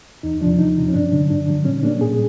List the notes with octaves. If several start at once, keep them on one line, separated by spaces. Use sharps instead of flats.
E2 D#4
C3 F3 D4
E2 D#4
C3 F3
C#4
G2 D4
D3 F#3
G2 D4
D3 F#3
A#2 C#4
G3 A#3 C#4 D4
A#2 G#4